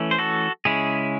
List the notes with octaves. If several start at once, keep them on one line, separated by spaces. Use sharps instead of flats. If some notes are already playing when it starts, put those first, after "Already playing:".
Already playing: E3 A3 C#4
C5
F#4 A4
C#3 G#3 C#4 E4 G#4